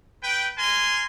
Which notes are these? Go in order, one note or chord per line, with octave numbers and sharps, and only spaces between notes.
B4 G5
A#4 G#5 C6